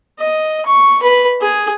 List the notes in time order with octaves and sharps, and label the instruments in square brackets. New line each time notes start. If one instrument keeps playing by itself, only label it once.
[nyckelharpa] D#5
C#6
B4
G#4